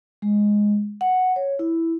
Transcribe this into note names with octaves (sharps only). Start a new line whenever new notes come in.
G#3
F#5
C#5
E4